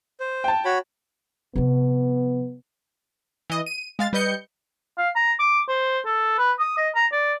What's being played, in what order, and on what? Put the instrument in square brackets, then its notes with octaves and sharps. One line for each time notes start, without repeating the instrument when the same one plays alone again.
[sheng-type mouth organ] C5
[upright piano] G5 A5
[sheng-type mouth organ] F#4 C#5 B5
[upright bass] C3 F3 [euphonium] B3
[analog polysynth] E3 D#5
D#7
G#3 F5 A6
G3 B4 D#5 G6 C#7
[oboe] F5
A#5
D6
C5
A4
B4
D#6
D#5
A#5
D5